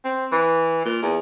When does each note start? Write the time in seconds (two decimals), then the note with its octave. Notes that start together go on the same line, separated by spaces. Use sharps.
0.04 C4
0.32 E3
0.85 A#2
1.02 E2